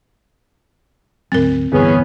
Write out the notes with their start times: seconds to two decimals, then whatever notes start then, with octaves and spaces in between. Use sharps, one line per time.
1.32 D2 G#2 F#3 C4 A#4
1.73 D1 G2 D3 E3 B3 C#4 G#4